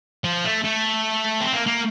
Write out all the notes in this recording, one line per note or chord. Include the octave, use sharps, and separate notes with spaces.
F3
A3
A3
C4
A#3
A#3